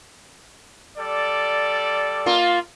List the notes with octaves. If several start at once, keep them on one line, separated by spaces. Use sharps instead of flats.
G3 A4 D5
A#3 F4